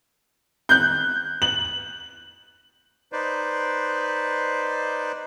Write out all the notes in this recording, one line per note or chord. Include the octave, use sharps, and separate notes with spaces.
F#6 G6
F#7
D#4 B4 C5 D5